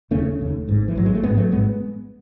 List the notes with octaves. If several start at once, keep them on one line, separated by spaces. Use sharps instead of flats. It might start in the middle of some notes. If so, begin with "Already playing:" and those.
E1 D#2 C#3 A3 C#4
E1 D#2 C#3
G#1 G#2
E3
G#1 G#2 F#3
G#3
A3
A1 G#2 G#3 B3
F#3 A3
A1 G#2 G#3 B3